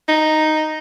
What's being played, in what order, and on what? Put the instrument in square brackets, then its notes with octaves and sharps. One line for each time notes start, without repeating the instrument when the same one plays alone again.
[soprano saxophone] D#4